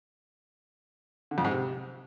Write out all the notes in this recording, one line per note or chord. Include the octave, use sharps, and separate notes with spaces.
D3
F2
G#2
C3